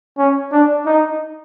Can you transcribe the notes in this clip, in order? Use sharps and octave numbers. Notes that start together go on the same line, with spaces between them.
C#4
D4
D#4